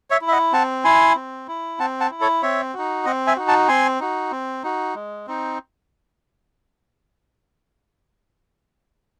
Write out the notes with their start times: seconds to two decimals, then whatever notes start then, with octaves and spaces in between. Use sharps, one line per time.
0.10 C#5 E5
0.21 E4
0.28 E5
0.32 D#5 F#5
0.52 C4 F#5 A5
0.84 E4 G#5 C6
1.16 C4
1.48 E4
1.79 C4 F#5 A5
2.00 F#5 A5
2.11 E4
2.21 A4 C#5
2.42 C4 C#5 E5
2.74 D#4 F#4
3.05 C4 D#5 F#5
3.27 E5 G#5
3.37 D#4 F#4
3.48 F#5 A5
3.68 C4 G#5 C6
4.00 D#4 F#4
4.31 C4
4.63 D#4 F#4
4.95 G#3
5.27 C4 D#4